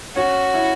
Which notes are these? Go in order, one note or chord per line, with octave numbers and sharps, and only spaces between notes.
C#4 F#4
E4